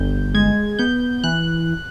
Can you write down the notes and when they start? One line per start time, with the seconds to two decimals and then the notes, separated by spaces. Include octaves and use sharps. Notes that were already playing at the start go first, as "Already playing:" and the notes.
Already playing: G1 G6
0.34 G#3 G#6
0.79 B3 G6
1.24 E3 F#6